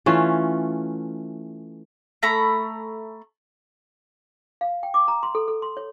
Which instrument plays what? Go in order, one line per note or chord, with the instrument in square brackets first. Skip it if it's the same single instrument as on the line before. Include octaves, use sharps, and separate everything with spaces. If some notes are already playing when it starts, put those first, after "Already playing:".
[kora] E3 A3 C#4 F4
[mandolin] A3 A#5 B5
[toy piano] F5
G5
D6
A#5
C6
A4
A4
C6
C#5